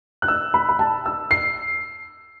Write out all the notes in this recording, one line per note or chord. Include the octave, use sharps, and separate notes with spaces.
F#6
E6
B5
B5
A5
E6
C7